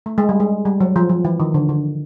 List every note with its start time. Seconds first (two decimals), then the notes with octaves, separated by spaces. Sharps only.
0.06 A3
0.18 G#3
0.29 G3
0.40 G#3
0.65 G3
0.80 F#3
0.96 F3
1.09 F3
1.25 E3
1.40 D#3
1.54 D3
1.69 D3